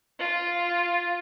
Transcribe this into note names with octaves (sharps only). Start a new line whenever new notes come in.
F4